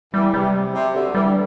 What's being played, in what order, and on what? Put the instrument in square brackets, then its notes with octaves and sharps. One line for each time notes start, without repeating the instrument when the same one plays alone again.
[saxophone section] E2 E3 [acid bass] G3
[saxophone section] C3 [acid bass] G3
[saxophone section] C3
D2 D3
[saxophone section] E3 [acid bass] G3
[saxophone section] D3